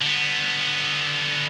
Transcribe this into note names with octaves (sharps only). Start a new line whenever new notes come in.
D3 B3